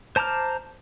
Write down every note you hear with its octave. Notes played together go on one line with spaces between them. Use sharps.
C5 A5 A#5 D6 F6